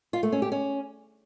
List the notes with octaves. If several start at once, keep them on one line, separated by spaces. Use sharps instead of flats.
F4
A3
C#4
G4
C#4